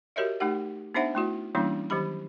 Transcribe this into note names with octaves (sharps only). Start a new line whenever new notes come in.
F#4 G4 A#4 C#5 D#5 E5
A3 D#4 G4 F#5
B3 D4 D#4 C5 E5 F#5
A3 E4 F#4
E3 G3 A#3 C#4 D4 E4
D#3 F#3 G4 B5